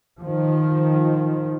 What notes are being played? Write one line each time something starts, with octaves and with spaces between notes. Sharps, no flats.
D#3 F3